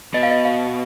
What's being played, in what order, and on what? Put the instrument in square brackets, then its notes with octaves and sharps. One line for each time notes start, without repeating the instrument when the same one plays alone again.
[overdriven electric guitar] B2 [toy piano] D#5
[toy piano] F5
D#5
F5